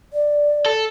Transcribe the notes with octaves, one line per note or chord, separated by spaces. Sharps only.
D5
A4